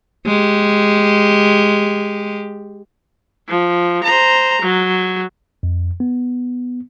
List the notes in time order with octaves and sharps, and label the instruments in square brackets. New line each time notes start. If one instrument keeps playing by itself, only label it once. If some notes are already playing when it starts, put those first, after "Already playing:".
[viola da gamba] G#3 G4
[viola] F3
C5 A#5
F#3
[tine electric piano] F2
B3